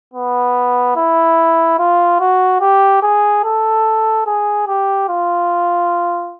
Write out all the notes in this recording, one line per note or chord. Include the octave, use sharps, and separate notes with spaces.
B3
E4
F4
F#4
G4
G#4
A4
G#4
G4
F4